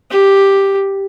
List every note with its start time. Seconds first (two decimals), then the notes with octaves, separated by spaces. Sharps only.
0.11 G4